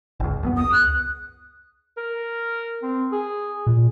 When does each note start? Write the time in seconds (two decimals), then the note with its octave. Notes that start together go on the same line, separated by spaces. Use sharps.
0.20 G1 C#2
0.43 F#2 G#3 B3
0.57 C#2 D#6
0.72 F#6
1.97 A#4
2.83 C4
3.12 G#4
3.67 A#2